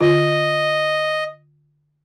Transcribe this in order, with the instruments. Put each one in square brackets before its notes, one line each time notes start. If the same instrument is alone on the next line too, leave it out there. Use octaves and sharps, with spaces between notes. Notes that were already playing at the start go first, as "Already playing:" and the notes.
[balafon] D3 F4 [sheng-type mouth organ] D#5